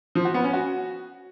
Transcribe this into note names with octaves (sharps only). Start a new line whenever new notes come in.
F3
F#4
B3
C#4
F#4